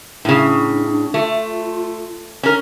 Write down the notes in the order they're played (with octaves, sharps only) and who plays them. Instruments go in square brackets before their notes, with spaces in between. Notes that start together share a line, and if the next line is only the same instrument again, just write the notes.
[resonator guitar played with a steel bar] A2 C#3 [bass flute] D4
[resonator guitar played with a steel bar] A3 [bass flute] F4
[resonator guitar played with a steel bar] C#4 A#4